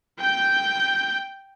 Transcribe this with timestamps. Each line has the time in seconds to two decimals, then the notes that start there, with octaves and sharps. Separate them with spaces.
0.19 G5 G6